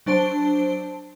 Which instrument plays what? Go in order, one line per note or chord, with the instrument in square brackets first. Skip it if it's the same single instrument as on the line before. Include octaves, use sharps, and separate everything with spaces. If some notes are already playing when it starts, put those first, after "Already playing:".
[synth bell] F#3 D4 C5 A5 D7 G7